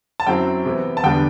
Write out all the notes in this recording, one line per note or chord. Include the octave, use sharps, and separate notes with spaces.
A5
F#2 F#3 C4 E4 G5
C3 E3 B3 E4
A5
E2 D3 G3 B3 D4 G5